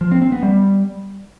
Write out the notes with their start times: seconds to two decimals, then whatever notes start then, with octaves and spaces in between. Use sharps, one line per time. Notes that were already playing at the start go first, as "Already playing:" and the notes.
0.01 F3
0.11 C4
0.22 C4
0.32 B3
0.43 G3